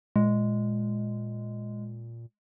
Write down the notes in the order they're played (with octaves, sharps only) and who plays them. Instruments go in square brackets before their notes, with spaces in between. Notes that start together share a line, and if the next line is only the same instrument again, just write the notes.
[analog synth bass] A#2 [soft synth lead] G#3